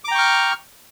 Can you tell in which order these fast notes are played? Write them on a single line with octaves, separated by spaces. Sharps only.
D6 A#5 G5 C#6 F6